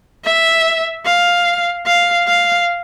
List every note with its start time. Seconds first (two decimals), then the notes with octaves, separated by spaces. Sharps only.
0.25 E5
1.06 F5
1.86 F5
2.28 F5